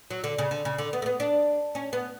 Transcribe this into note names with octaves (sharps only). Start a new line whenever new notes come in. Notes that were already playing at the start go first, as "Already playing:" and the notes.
F#3
D3
C#3
D3
C#3
D3
B3
A3
B3
D4
C#4
B3